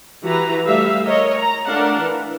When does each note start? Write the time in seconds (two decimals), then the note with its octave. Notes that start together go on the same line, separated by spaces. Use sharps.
0.24 E3 F#4 G4 B4 A#5
0.66 G3 A3 G4 E5 F5
1.04 A#4 C#5 D#5
1.37 A#5
1.68 A3 D4 A#4 F5 F#5
2.00 E3